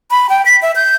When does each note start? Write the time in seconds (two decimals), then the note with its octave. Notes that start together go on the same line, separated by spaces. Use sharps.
0.11 B5
0.29 G5
0.45 B6
0.62 E5
0.76 G6